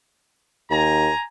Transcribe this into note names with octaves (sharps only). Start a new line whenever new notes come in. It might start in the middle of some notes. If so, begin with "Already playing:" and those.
D#2 G#5 A#5